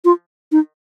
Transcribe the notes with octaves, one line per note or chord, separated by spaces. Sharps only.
F4
D#4